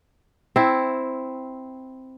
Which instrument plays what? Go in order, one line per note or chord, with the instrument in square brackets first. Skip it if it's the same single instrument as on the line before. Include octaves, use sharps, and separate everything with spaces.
[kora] C4 E4